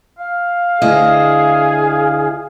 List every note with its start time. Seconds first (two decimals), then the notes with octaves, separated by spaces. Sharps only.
0.18 F5
0.82 D2 E4 G#4 D#5